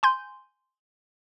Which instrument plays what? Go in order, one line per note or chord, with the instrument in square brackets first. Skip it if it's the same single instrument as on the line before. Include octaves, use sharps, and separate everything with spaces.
[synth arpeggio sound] G#5 C6 G6